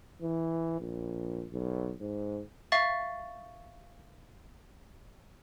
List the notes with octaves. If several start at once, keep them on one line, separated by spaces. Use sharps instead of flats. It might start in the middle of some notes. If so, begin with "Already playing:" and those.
E3
A#1
B1
G#2
E5 F5 C#6 A6